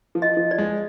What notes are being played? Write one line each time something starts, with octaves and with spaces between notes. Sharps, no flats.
F3
D#5
F3
D5
G#3